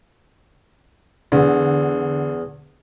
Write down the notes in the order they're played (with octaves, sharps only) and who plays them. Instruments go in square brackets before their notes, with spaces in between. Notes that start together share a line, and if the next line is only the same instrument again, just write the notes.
[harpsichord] E2 [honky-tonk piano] D3